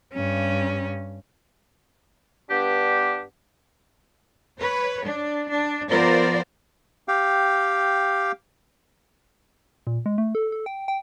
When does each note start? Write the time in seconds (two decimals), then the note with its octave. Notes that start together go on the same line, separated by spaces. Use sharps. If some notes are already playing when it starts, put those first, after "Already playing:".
0.14 G2 C#4
2.50 G2 B3 D4 G4
4.59 B4 C#5
5.04 D4
5.48 D4
5.89 F3 B3 F4 A#4 C5 D5
7.08 G4 F5 G5
9.87 A#2
10.06 G#3
10.18 A3
10.35 A4
10.52 A4
10.66 G5
10.88 G5